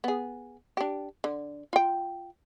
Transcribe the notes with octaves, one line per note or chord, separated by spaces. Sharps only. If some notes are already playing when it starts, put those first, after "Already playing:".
B3 G#4
D4 G4
D3
F4 G5